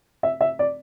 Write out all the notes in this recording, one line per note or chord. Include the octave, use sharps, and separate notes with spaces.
E5
E5
D5